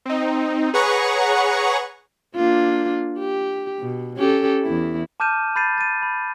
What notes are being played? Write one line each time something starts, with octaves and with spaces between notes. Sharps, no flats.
C4 D#4
G#4 B4 C#5 F#5 A#5 C#6
A#3 D4 F4
G4
B2
C#4 G4 A4
E2 E4
A5 D6 F6 G6 D#7 E7
B5 G6 A6 C7 D#7
A6 D#7
B5